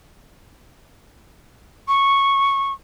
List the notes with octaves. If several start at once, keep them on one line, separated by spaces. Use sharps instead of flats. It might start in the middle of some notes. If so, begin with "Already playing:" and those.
C#6